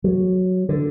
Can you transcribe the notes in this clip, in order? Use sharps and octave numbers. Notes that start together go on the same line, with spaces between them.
F#3
D3